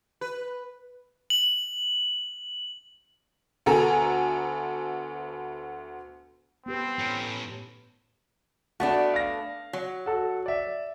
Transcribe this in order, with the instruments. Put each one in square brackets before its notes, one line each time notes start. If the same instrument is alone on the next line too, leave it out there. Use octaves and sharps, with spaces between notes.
[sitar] B4
[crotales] F#7
[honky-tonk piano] D2 B3 A4 G#5 A#5
[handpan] B3 G4 B4 [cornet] C4
[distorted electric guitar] A2 C#4
[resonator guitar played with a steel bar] A3 B3 D4 [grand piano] F#4
[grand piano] F5 A#6
[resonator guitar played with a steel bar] F#3
[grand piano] F#4 A4
D5 E5